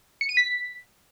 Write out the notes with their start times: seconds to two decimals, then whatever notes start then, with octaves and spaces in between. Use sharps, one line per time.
0.21 C#7
0.29 D#7
0.37 B6